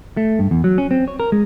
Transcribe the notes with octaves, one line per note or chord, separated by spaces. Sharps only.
A3
G2
E2
F#3
C#4
C4
C#5
A#4
G#3